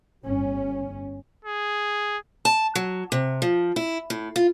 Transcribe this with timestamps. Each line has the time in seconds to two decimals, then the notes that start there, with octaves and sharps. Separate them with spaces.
0.22 G1 C#4
1.45 G#4
2.45 A5
2.75 F#3
3.12 C3
3.42 F3
3.76 E4
4.10 A2
4.36 F4